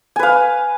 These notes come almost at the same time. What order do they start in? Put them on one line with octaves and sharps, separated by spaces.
G#5 B4 F5